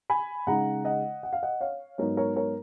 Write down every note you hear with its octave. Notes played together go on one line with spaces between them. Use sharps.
G#5 B5
C#3 G#3 D#4 F#5 A#5
D#5 F#5
F#5
F5
D#5 F#5
C#5 F5
G#2 F#3 B3 D#4 A#4 C#5
A#4 C#5
A#4 C#5